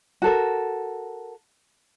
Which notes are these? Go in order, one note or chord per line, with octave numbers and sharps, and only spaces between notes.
F#4 A4 A#4